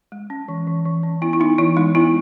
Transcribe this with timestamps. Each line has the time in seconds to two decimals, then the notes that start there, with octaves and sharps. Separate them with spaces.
0.12 G#3
0.30 C#4
0.48 E3
0.67 E3
0.85 E3
1.03 C#4
1.22 B3 E4
1.33 E4
1.40 B3 D#4
1.58 E3 E4
1.77 G#3 D#4
1.95 B3 E4